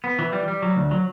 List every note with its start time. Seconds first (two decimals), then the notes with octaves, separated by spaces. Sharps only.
0.04 B3
0.19 E3
0.32 G3
0.48 G3
0.62 F#3
0.76 D2
0.91 F#3